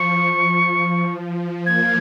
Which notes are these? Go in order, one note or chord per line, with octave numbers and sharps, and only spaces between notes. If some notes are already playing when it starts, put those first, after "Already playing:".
Already playing: F3 C#6
F3
F3
A#3 G#6